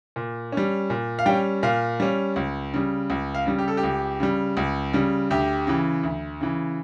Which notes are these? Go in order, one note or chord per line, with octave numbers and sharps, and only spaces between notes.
A#2
G3 C#4
A#2
F5
G3 C#4 G5
A#2 F5
G3 C#4
C#2
C#3 G3
C#2
F5
C#3 G3
G4
A4
G4
C#2
C#3 G3
C#2
C#3 G3
D2 G4
C#3 E3
D2
C#3 E3